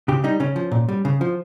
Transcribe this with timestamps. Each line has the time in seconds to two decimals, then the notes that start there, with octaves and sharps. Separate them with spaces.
0.08 C#3 G4
0.24 G3 D#4
0.40 C#3 C#4
0.56 F3
0.72 A#2
0.89 G3
1.05 C#3
1.21 F3